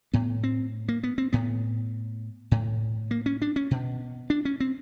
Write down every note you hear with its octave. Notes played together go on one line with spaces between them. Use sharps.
A2 B3
C4
A#3
B3
C4
A2 B3
A2
A#3
C#4
D4
C#4
B2
D4
C#4
C4